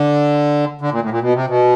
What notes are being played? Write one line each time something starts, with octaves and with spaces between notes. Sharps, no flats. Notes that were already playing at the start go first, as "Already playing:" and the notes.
Already playing: D3
D3
A#2
A2
A#2
B2
C3
B2